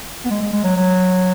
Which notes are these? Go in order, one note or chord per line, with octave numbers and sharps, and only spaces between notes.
B3
G#3
G#3
G#3
F#3
F#3